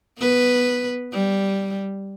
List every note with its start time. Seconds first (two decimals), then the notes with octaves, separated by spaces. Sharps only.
0.18 B3 B4
1.13 G3